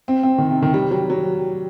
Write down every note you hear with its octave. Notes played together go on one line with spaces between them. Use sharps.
C4
C4
D#3
C3
D#3
G3
F#3
F#3